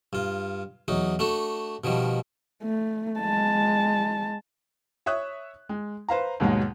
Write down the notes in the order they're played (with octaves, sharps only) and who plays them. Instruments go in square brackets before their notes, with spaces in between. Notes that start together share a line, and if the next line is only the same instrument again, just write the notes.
[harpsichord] G2 F4
E2 F#3 D#4
A3 D4 F#4 A4
B2 D#3 F3 G3
[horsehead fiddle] A3
G#3 A5
[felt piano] C#5 E5 C#6 D#6 F#6
G#3
B4 C5 F5 A#5
D#2 G#2 B2 F#3 G#3